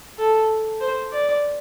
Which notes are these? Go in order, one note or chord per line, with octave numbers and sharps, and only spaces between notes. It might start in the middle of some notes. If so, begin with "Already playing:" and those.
A4
C5
D5